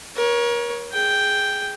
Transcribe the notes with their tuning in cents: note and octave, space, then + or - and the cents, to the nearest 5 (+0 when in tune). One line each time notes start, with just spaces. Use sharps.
A#4 +35 C#5 +0
G#4 +5 G5 +0